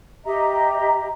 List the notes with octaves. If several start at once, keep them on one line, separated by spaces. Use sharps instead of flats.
G4 D#5 E5 A#5